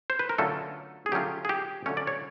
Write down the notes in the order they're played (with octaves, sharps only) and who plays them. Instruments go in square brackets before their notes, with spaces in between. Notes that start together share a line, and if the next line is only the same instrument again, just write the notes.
[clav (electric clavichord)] C5
B4
A#4
D3 F#3 A3 C#4 F4 A4
G#4
D3 F#3 A3 C#4 F4 G4
G#4
G4
D3 F#3 A3 C#4 F4 C#5
D5
C#5